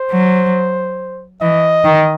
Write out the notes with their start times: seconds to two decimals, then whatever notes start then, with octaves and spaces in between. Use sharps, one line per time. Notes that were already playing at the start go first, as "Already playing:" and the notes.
Already playing: C5
0.11 F#3
1.41 E3 D#5
1.85 D#3